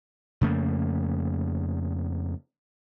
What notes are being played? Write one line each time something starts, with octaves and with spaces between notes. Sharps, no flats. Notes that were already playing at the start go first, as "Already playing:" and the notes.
F2 C#3 A3 A#3